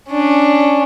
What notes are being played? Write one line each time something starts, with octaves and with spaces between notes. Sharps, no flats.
C#4 D4